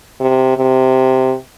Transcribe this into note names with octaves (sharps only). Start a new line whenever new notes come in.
C3
C3